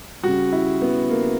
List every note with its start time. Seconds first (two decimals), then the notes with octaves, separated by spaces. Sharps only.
0.23 C#3 G3 F#4
0.53 E4
0.82 B3
1.10 A#3